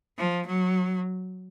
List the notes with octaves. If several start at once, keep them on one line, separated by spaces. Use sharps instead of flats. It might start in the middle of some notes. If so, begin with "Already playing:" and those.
F3
F#3